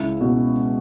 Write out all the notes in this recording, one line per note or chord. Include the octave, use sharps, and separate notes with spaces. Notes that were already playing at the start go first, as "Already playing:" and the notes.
Already playing: C#2 E4
B2